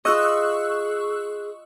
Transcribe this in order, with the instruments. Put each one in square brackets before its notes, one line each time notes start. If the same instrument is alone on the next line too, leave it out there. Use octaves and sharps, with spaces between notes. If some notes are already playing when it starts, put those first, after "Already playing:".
[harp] F4 D#5 [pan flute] G#4 [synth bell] C#6 E6 F#6